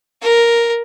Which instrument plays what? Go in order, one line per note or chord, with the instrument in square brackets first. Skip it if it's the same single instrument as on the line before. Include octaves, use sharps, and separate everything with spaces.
[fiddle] A#4